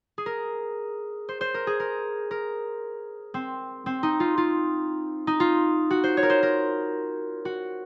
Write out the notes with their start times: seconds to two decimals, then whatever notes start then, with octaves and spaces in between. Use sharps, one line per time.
0.18 G#4
0.26 A#4
1.29 C5
1.41 C5
1.54 A#4
1.67 G#4
1.80 A#4
2.31 A#4
3.34 C4
3.86 C4
4.03 D#4
4.20 F4
4.38 F4
5.27 D#4
5.40 F4
5.91 F#4
6.04 C5
6.17 C#5
6.23 A#4
6.30 C5
6.43 A#4
7.45 F#4